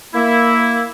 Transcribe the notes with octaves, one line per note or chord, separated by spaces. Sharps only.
A#3 E4